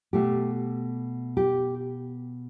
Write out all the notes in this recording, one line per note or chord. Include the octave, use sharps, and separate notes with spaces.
B2 A3 G4
G4